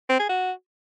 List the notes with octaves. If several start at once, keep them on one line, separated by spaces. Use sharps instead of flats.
C4
G#4
F#4